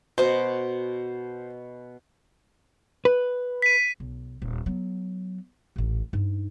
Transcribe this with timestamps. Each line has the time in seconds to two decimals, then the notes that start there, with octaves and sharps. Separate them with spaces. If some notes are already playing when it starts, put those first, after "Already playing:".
0.18 B2 C5 D#5
3.05 B4
3.62 B6 D#7
4.00 B1
4.42 D#1
4.66 F#3 B3
5.76 D#1 A1
6.13 G2 D#4